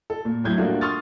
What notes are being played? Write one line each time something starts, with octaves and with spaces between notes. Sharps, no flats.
A4
A#2
A2 F#3 G6 G#6
G3 A3 A#3 D4 F4 F#4
C6 C#6 D#6 F6 A6